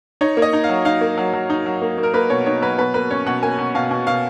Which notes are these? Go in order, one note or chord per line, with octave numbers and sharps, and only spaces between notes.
D#4 C#5
A#3
D#5
D#4
F5
F#3
D#4 F5
A#3
F#3
F#3
D#4
F#3
A#3
A#3
A#4
A#3 B4
B2 C#5
D#4 C#5
F#3 B4
B2 B4
A#3 B4
C#4 C#5
B2 F#5
A#3 G#5
B2
B2 F5
B2
B2 F5